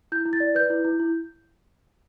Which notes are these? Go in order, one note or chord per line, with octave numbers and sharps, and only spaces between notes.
E4 G6
E4
A6
D5
B4 G6
E4
E4
E4